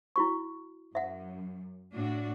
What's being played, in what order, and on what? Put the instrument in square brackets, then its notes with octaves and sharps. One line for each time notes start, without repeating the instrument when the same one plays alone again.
[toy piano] E4 F#4 C#6
[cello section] F#2 [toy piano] E5 F#5
[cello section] A2 D4 F#4